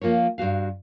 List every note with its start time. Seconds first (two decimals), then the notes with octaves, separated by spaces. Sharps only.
0.01 F3 A#3 F4 A#4 C#5
0.38 G2 C3 F#4 F5